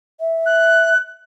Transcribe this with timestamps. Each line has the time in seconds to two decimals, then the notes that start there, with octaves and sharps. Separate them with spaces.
0.20 E5
0.46 F#6